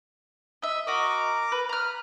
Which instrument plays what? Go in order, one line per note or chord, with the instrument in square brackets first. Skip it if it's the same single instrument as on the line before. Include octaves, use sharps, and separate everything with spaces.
[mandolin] D#5 E5
[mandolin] F#4 D#5 [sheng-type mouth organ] A#4 A#5 D6
[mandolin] B4
[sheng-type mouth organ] B4 [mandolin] A#5 F6